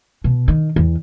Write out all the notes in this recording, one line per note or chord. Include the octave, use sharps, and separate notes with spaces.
B2
D#3
E2